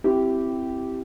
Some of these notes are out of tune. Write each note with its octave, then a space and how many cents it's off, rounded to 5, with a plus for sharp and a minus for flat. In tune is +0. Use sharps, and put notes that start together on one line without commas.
C4 +0 E4 +15 G4 -10